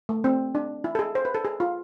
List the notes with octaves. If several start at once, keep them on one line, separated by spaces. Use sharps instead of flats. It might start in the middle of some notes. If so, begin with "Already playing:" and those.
A3
C4
D4
E4
A4
G#4
C5
B4
A4
G#4
F4